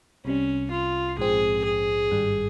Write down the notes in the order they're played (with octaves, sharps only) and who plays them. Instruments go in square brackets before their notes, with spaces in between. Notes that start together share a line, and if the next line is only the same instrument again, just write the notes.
[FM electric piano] C2 C3 G3 [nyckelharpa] C#4
[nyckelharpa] F4
[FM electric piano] A#1 G#2 F3 C4 [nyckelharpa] G#4
[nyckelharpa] G#4
[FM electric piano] G#1 G2 G3